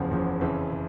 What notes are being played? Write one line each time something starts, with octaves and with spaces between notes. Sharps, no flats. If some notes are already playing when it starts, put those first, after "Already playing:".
Already playing: F#1 E2 C#3 F3
F#1 E2 C#3 F3
F2 C#3 E3
C#3